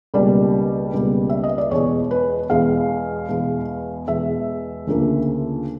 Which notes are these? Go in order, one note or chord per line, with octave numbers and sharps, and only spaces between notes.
C#2 B2 G3 A#3 D5
C#2 B2 G3 A#3
E5
D#5
D5
E2 B2 G#3 C#5
B4
E2 B2 G#3 F5
E2 B2 G#3
E2 B2 G#3 E5
D2 C#3 F3 A#3